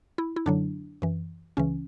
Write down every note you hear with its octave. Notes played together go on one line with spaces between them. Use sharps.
E4
E4
F#2 D3 F#3 D4
F#2 E3
C#2 C#3 E3 C#4